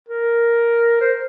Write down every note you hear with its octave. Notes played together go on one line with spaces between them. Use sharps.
A#4
C5